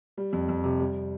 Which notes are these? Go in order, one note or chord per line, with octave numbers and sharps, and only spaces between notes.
G3
F2
F2
C3
G3